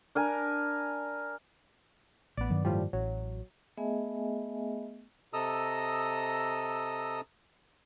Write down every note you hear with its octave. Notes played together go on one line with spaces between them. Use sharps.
D4 A#4 G#5
A1 B3 D5
G2 D#3 F#3
A2 F3 G3
A1 F#3
A3 B3 G#4 D#5 E5 G#5
C3 A4 D#5 A#5 D#6 E6